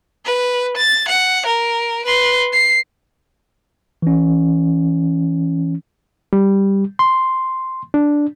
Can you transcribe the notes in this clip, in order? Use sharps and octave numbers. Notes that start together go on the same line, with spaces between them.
B4
A6
F#5
A#4
B4 C6
C7
E3 C#4
G3
C6
D4